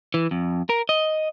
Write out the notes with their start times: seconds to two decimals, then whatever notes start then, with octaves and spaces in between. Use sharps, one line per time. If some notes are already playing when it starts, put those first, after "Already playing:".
0.14 E3
0.31 F2
0.69 A#4
0.89 D#5